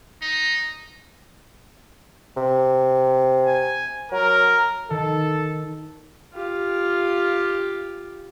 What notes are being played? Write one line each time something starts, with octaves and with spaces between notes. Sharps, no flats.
D#4
C3
G#5
F#3 A#4
D#3 A4
F4 G4